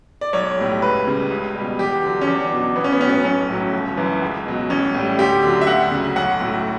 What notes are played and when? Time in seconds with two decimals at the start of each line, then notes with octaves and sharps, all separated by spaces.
0.21 D5
0.33 B1 C#5
0.58 A2 G3
0.82 C#2 B4
1.06 C#3 G3
1.30 C#2
1.54 B2 G3
1.79 E2 G4
2.03 D3 F#3
2.21 C#4
2.27 E2 D4
2.52 B2 F#3
2.76 A1 B3
2.84 C#4
2.92 B3
3.00 A2 C#4
3.05 F#3 B3
3.24 B1 C#4
3.49 A2 F#3
3.73 G1
3.97 F#2 E3
4.22 C#2
4.46 B2 F#3
4.70 A1 C#4
4.94 A2 G3
5.19 D2 G4
5.43 D3 F#3
5.61 E5
5.67 D2 F#5
5.91 C#3 F#3
6.16 B1 F#5
6.41 A2 F#3